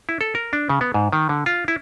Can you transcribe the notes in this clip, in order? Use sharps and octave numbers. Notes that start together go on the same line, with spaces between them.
E4
A4
A#4
D4
C#3
B3
G#2
D#3
D3
F4
E4